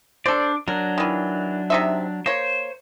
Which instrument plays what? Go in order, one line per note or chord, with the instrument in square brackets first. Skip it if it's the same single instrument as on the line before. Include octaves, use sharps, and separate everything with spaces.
[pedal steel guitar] D4 D5 [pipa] A4 C5
[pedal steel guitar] F#3 D4 [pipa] A#4
[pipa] D#3 E3
C3 D#4 E5
[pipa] A#3 C#5 [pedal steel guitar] C5